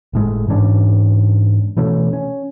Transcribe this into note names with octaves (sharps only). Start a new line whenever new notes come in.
G1 A2 G#3
G#2 E3 C#4 D4
B2 E3 A3 C#4
C#4